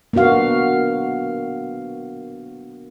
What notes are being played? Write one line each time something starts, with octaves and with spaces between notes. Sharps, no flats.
A#3 B3 D4 F#4 F5